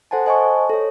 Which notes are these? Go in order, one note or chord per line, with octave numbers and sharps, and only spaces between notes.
A4 C5 F#5 G#5 A5
C5 D#5 G#5 A5 C#6
A4 C#5